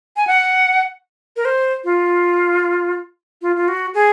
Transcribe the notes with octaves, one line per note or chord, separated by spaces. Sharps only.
G#5
F#5
A#4
C5
F4
F4
F4
F#4
G#4